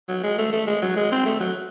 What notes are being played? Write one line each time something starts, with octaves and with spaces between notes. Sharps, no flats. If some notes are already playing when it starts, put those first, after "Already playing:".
F#3
G#3
A3
A3
G#3
F#3
G#3
C4
A3
F#3